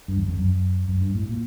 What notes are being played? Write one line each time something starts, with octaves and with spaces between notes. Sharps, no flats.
G2
E2
F2
F#2
F#2
G2
A2
A#2